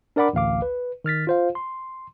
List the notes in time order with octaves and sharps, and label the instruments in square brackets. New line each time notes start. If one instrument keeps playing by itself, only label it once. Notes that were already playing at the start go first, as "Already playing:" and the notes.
[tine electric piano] D4 A#4 D5 F#5 B5 D6
A1 D2 F5 D6
B4
D#3 F6 A6 B6
F4 C5 F5
C6